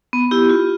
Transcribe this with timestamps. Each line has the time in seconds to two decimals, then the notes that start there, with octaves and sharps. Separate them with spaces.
0.13 B3
0.31 E4 G4
0.49 F4